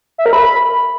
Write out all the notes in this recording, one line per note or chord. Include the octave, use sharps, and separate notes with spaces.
E5
A#4
B5